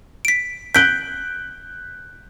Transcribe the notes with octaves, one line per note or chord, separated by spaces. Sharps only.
B6 D7
F#6 G6 B6 D7 G7